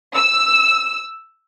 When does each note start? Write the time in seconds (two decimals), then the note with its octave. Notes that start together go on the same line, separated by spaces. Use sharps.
0.14 E6